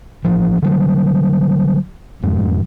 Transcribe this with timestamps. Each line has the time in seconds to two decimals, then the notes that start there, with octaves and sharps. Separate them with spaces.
0.24 A1 F3
0.62 D3 F#3 G3
2.22 E1 F2 G#2